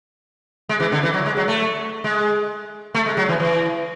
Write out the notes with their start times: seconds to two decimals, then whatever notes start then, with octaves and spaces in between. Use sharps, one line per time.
0.69 G#3
0.80 E3
0.92 D3
1.03 E3
1.14 F#3
1.26 G#3
1.37 F#3
1.48 A3
2.04 G#3
2.94 A3
3.06 G#3
3.17 F#3
3.29 E3
3.40 E3